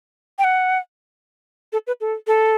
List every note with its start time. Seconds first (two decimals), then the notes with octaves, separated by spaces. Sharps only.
0.39 G5
0.44 F#5
1.73 A4
1.87 B4
2.01 A4
2.27 A4